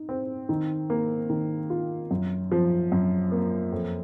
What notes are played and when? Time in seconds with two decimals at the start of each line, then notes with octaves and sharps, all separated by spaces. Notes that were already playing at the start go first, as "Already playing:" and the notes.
Already playing: D#4
0.09 C4
0.49 D#3
0.90 A#3
1.30 D#3
1.70 F4
2.11 F#2
2.52 F3
2.92 F#2
3.32 A#3
3.72 F2